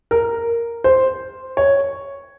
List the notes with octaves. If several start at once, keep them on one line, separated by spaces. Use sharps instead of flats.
A#4
C5
C#5